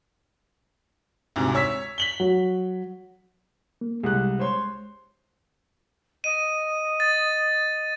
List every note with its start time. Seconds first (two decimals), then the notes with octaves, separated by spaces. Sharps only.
1.36 D2 G#2 C3
1.54 C#5 E6 B6
1.98 B6 F#7 G7
2.20 F#3
3.81 A#3
4.03 C2 G3 G#3 F#6
4.39 C5 C#5 C6
6.24 D#5 D#7
7.00 A6